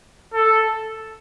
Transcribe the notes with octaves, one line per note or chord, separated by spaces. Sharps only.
A4